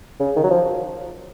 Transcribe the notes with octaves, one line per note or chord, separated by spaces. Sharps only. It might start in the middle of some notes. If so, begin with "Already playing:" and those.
C#3
D#3
F#3
F3